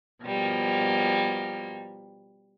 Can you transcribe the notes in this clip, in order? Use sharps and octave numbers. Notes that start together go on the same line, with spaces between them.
B2 F3 G3 A#3